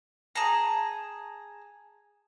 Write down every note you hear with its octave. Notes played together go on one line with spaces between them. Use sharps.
G#4 A5 A#5